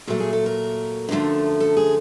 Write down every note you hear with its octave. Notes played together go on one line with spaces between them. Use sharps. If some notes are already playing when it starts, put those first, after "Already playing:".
A#2 F#3 A3 G#4
G#4
A4
A#4
F#2 D3 F3 A3
A4
G#4